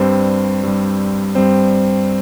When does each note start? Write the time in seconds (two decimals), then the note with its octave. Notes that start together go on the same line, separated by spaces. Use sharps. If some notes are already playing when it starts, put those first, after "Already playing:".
Already playing: G2 G3 C4 C5
0.63 G2 G3
1.35 G2 G3 C4 C5